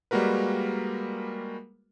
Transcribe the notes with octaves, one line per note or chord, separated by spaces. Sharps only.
G3 G#3 A#3 F#4 A#4 B4